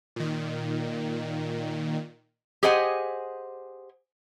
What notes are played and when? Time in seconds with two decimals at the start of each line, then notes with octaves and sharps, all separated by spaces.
0.16 A#2 D#3
2.63 G4 G#4 C5 D#5 F#5 G#5